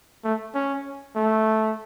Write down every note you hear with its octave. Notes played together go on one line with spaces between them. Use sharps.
A3
C#4
A3